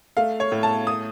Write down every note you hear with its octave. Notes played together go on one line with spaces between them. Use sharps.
A3 F5
C#5
A2
A5
D#6